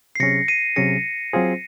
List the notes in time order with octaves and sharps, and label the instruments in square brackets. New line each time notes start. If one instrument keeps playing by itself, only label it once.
[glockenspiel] C7
[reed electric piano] C3 F#3 C#4 G#4 [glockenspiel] A#6 C#7
[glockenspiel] C7 D#7
[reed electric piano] C3 F#3 C#4 G#4 [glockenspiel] A#6 C#7
[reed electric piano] F#3 C4 F4 G#4 C5